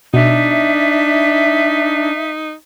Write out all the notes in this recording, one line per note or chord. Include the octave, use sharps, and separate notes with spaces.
B2 D4 D#4 E5